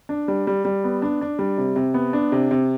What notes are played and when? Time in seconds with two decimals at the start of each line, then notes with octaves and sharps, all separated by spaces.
0.09 D4
0.28 G3
0.47 G3
0.65 G3
0.84 B3
1.02 D4
1.21 D4
1.39 G3
1.58 C3
1.76 C3
1.94 B3
2.13 D4
2.32 C3
2.51 C3